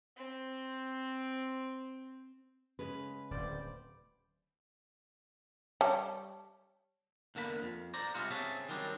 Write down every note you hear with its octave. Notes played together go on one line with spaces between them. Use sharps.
C4 C5
C#3 G#3 C#4 B4
D1 C5 D5
G3 C#5 A5
E2 D3 A#3 A5 B5
F2
C5 D5 A#5
C3 G3 G#3 F4 F#4
C#3 C4 G#4 C#5 E5 A5
D#3 F#3 G3 C4 D4